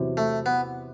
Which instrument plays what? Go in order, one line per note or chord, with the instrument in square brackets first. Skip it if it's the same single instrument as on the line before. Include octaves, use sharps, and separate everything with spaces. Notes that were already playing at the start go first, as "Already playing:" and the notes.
Already playing: [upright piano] E2 C3 F#3
[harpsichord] A3
B3